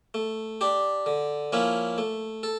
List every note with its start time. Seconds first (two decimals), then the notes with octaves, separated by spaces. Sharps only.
0.14 A3
0.61 D4 G4
1.06 D3
1.52 F3 A#3 C#4 E4
1.98 A3
2.43 A4